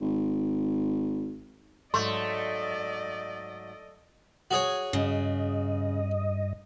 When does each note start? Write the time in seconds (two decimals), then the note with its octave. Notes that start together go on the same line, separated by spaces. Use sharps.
0.01 G#1
1.94 G#2 F#3 A3 D5 D#5 C6
4.51 F#4 G#4 C#5
4.93 G2 C#3 D#5